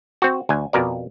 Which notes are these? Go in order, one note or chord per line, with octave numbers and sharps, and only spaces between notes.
C4 F#4
D2 G#5
F2 B2 A#4 D5